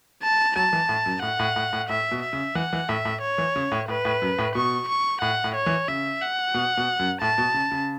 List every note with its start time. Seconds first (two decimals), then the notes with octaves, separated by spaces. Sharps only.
0.23 A5
0.56 F#3 A5
0.73 E3
0.89 A2
1.06 F#2
1.22 A2 F#5
1.39 A2
1.56 A2
1.73 A2
1.89 A2 E5
2.11 B2
2.22 E5
2.33 C#3
2.55 E3 F#5
2.73 E3
2.89 A2 E5
3.05 A2
3.22 C#5
3.38 E3
3.56 C#3
3.72 A2
3.88 A2 B4
4.05 A2
4.22 F#2
4.38 A2
4.55 B2 C#6
4.88 C#6
5.21 A2 F#5
5.44 A2
5.55 C#5
5.66 E3
5.88 C#3 E5
6.21 F#5
6.54 B2
6.77 B2
6.99 F#2
7.21 A2 A5
7.38 B2
7.54 C#3
7.72 C#3